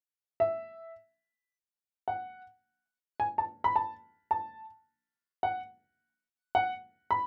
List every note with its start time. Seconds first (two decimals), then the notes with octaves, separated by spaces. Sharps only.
0.40 E5
2.08 F#5
3.20 G#5
3.38 A5
3.64 B5
3.76 A5
4.31 A5
5.43 F#5
6.55 F#5
7.11 B5